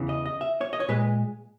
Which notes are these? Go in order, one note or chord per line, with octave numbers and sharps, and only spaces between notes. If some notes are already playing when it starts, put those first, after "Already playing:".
Already playing: E2 C#3 E3
D#5
D#5
E5
C#5
D#5
C#5
A#2 G#3 B4